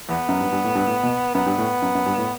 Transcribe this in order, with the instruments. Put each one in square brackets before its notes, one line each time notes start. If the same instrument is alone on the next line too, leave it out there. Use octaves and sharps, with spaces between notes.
[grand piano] E2 [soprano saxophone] B3
[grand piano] F#2
G2
G2
A2
G2
A2
B2
[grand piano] F#2 [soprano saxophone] B3
[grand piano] G2
A2
F#2
F#2
G2
A2